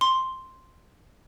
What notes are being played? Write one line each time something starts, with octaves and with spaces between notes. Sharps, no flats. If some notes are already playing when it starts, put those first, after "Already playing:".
C6